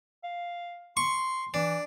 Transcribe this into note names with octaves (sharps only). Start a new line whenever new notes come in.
F5
C6 C#6
E3 D4